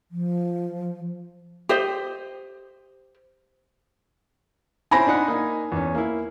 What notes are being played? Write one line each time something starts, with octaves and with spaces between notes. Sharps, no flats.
F3
G4 C5 D#5
C4 C#4 E4 G#5 B5 A#6
D4 D#4 F#5
A#3 D#4
E2 C#4
A#3 E4